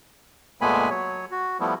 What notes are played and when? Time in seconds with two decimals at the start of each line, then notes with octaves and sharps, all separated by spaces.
0.61 A#2 G#3 A3 B3 G#5 B5
0.90 F#3 C#5
1.31 F#4
1.60 F3 G3 A3 B3 E4